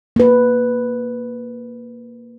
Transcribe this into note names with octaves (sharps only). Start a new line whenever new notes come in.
A#3 B4